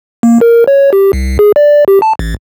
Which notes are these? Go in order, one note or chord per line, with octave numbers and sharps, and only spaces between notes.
A#3
A#4
C#5
G4
C2
G#4
D5
G4
A5
A1